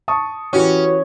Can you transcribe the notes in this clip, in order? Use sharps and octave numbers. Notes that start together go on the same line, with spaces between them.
A5 C#6 D#6
E3 C#4 F#4 G4